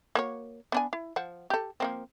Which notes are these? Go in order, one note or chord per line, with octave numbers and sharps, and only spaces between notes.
A#3 F#4 C#5
B3 D4 G#5
E4
F3 F#5
G4 A4
F3 A#3 C4